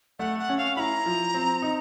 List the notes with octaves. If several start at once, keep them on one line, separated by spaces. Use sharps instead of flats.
A3 F#5
F#5
C#4
F5
E4 A#5 B5
F3
C4
D#4